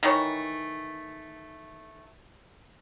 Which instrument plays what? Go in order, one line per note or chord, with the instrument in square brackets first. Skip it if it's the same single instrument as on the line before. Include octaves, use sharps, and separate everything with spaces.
[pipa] D#3 E3 A3 C#5